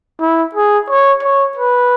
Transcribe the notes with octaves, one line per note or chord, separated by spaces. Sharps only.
E4
G#4
C#5
C#5
B4